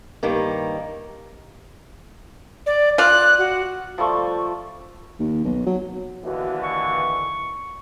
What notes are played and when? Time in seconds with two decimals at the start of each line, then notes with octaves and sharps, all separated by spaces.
0.23 G2 D#3 A#3
2.66 D5
2.98 F4 D5 F#6
3.39 F#4
3.98 F3 G3 A3 C#6
5.19 D#2
5.44 B1
5.66 F#3
6.24 D#2 D3 E3 F#4
6.63 C#6